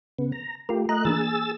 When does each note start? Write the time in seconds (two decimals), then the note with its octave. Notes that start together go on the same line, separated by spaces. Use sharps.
0.19 C#3 B3
0.32 A#5
0.69 A3 F4 G4 A#4
0.89 A3 D#5 A#5 F#6
1.05 E3 A#3 D4 G#4 E6 A6